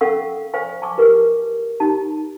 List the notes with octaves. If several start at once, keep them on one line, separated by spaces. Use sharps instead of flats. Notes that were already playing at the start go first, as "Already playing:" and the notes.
C#4 A4 F5 F#5 C#6 E6
C5 D5 F5 G#5 C#6
G#5 A5 C#6 D6
G4 A#4 B4 C#6
D#4 G4 A5